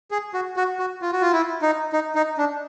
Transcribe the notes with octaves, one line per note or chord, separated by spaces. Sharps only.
G#4
F#4
F#4
F#4
F4
F#4
F4
E4
D#4
D#4
D#4
D4